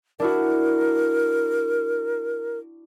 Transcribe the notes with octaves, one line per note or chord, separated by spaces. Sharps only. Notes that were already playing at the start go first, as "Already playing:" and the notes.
D4 E4 F#4 A#4